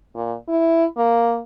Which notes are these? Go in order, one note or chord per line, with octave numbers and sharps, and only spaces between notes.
A#2
E4
A#3